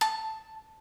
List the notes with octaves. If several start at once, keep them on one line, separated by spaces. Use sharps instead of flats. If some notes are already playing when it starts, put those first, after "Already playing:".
A5